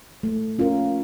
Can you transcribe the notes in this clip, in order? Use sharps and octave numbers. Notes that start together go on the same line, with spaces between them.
A3
C#4 F4 A#4